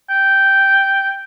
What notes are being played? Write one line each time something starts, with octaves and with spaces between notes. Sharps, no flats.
G5